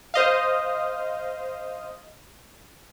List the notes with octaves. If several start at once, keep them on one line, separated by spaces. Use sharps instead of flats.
C5 D#5 F5